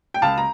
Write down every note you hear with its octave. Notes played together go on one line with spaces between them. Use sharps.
G5
C#2 F5 A5
A#5